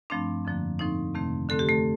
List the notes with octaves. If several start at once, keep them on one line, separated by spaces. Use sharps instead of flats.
G2 F3 A3 C4 D4
F2 D3 F3 A#3
A2 F3 C4 D#4
F2 C3 D#3 A3 C4
D3 A3 C4 A4
G4
A3 A4